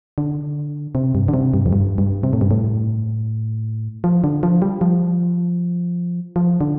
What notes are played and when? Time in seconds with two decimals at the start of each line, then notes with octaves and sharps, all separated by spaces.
0.18 D3
0.95 C3
1.15 G2
1.28 D3
1.34 C3
1.54 G2
1.66 F2
1.73 G2
1.98 G2
2.23 C3
2.33 A2
2.41 G2
2.51 A2
4.04 F3
4.24 D3
4.43 F3
4.62 G3
4.81 F3
6.36 F3
6.61 D3